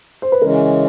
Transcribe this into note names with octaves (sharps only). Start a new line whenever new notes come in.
C5
B4
C#3 E3 G#3 C#4 A#4